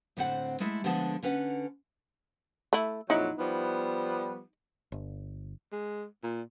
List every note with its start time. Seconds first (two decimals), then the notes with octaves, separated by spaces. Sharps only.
0.17 A2 D3 C4 C5 F#5
0.60 G#3 A3 E4
0.84 D3 F3 G#3 B3 F#5 A5
1.23 D3 C#4 B4 F#5
2.73 A3 E4
3.10 F2 A#2 F#3 D#4 E4
3.39 F3 G3 B3
4.92 G1
5.72 G#3
6.23 A#2